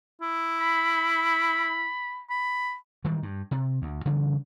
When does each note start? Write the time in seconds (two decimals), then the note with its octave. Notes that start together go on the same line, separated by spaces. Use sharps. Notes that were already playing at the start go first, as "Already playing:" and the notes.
0.21 E4
0.61 B5
2.30 B5
3.04 D#3 E3 G3 G#3
3.23 G2
3.51 C3
3.82 D2
4.05 C#3 E3 G3 C#4